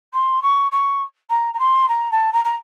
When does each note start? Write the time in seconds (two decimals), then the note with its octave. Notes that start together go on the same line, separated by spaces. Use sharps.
0.13 C6
0.42 C#6
0.71 C#6
1.30 A#5
1.54 A#5
1.59 C6
1.88 A#5
2.11 A5
2.33 A#5
2.45 A#5